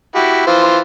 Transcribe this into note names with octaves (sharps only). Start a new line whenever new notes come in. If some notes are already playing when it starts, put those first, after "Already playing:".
E4 F#4 G4
E3 F4 C5